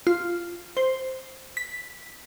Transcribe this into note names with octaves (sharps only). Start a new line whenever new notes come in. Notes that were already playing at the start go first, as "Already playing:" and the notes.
F4
C5
B6